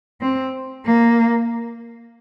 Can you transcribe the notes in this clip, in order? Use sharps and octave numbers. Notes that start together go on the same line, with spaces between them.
C4
A#3